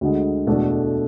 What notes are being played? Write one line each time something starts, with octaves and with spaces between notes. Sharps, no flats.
D2 D3 G#3
E2 B2 A3 D4 A4